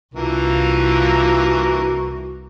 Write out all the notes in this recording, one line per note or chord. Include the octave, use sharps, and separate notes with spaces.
C2 D3 E3 A#3 F4 F#4